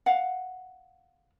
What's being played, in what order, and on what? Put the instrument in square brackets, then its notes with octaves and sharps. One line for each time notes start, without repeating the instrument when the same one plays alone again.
[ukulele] F5 F#5